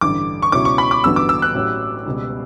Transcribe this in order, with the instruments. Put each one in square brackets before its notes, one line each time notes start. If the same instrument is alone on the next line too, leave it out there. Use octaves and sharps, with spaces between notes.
[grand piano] A1 G2 D3 [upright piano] D6
[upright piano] C#6
[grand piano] C#2 B2 F#3 C#4 E4 [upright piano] D6
[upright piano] C#6
B5
D6
[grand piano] A1 G2 D3 F#3 B3 [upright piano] E6
[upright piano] D6
E6
F#6
[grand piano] A2 F#3 C#4 G4
C#2 B2 G3